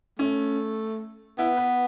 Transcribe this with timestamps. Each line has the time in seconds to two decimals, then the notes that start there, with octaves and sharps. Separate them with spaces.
0.19 A3 C#4
1.38 B3 E4
1.57 B4